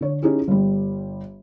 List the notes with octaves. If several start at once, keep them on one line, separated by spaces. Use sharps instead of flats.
D3 C#5
C#4 D#4 E4 G4 G#4
G1 G3